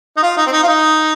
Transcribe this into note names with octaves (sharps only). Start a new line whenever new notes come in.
D#4
F4
D#4
C4
D#4
F4
D#4